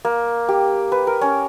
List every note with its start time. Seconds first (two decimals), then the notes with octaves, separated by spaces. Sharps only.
0.05 A#3
0.49 G4
0.92 B4
1.07 A#4
1.21 C#4